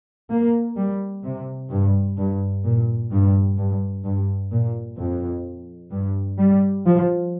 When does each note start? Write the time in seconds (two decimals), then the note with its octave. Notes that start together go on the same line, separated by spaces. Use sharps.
0.30 A#3
0.77 G3
1.24 C3
1.70 G2
2.17 G2
2.64 A#2
3.11 G2
3.58 G2
4.04 G2
4.51 A#2
4.98 F2
5.92 G2
6.39 G3
6.86 F3